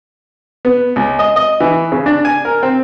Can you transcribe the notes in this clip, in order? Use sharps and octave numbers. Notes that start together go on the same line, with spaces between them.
B3
C#2
D#5
D#5
E3
C#3
D4
G#5
A#4
C4